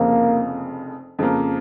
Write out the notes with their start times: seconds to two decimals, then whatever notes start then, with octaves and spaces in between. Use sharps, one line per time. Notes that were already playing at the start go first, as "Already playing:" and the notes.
Already playing: F1 F2 C#3 F3 A#3
1.19 F2 C#3 F3 A#3